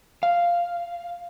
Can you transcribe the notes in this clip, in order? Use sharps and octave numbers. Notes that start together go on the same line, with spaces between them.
F5